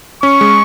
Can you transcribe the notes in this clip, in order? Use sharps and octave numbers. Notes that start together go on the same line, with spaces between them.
C#4 C#6
G#3